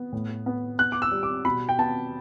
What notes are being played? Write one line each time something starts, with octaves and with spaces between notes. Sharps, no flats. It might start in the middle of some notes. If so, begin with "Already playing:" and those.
Already playing: B3
A2
B3
B3 F#6
D6
E6
G3
D6
B2 B5
G5
B3 A5